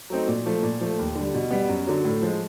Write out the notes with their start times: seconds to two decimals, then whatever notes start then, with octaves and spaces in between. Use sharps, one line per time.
0.10 F#3 A3 C4 D#4
0.28 A#2
0.46 F3 A3
0.63 A#2
0.81 F3 A3
0.99 D#2
1.15 D3 G3
1.34 B2
1.51 G3 B3
1.69 F#2
1.87 D3 F#3
2.04 A2
2.22 F3 G#3